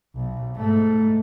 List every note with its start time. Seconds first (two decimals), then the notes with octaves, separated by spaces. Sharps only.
0.16 B1
0.56 G#2 A3